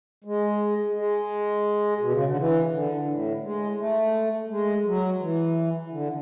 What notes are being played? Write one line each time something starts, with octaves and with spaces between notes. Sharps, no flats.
G#3
G#3
B2
C#3
D3
E3
D3
A2
G#3
A3
G#3
F#3
E3
D3